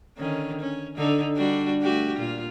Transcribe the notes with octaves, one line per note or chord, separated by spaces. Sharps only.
D3 D#3 C#4
C#4
D3 D#4 A4
G3 D4 F#4
A3 F#4 G4
A#2 F4